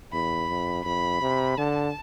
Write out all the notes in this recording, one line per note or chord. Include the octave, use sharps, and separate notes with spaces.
E2 B5
F2
F2 B5
C3
D3 A5